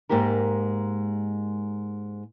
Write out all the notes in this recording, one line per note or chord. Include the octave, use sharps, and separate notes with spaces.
G#2 G#3 A#3 G4 A#4